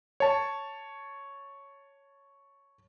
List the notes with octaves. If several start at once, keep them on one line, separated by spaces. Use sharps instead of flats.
C#5 A5